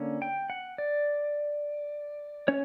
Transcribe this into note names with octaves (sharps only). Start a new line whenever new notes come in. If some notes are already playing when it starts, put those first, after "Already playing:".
Already playing: D3 A#3 C#4
G5
F#5
D5
C#4 C#5